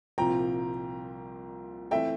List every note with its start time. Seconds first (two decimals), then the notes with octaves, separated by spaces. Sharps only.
0.18 C2 A#2 F3 C4 G5 A#5
1.91 E3 A3 C4 E5 G5